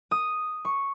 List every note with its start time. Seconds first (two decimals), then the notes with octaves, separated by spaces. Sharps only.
0.11 D#6
0.65 C#6